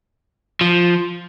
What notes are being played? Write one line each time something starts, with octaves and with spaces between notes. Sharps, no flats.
F3